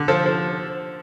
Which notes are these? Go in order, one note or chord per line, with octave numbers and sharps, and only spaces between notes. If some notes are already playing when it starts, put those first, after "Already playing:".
Already playing: D3
F3 A4 C5
F3